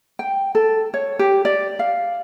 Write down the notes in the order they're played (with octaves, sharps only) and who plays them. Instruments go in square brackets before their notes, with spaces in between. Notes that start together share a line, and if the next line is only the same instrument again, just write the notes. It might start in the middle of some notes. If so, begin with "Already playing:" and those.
[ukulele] G5
A4
C#5
G4
D5
F5